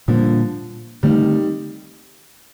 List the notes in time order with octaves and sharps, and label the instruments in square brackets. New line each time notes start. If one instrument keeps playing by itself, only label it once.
[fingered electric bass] A#2 G3 A#3 D4 [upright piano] D3 F3
[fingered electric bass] D3 A3 C4 [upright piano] D#3 G3